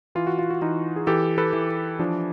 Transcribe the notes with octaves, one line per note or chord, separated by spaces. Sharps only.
E3 F4
F#4
F4
F#4
E3 D#4 F4
G#4
E3 G4 A4
A4 B4
E3
F3 D4